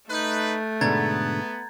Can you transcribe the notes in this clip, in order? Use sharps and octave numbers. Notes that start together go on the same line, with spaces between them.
A3 D#4 B4 F#6 G6
G#2 B2 D3 B3 A#5 G#6 A6